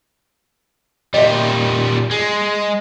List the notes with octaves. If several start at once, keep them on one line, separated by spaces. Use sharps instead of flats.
A#2 G3 D#5 E5
G#3